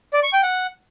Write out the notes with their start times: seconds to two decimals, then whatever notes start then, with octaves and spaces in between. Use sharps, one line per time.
0.13 D5
0.23 C#6
0.33 G5
0.43 F#5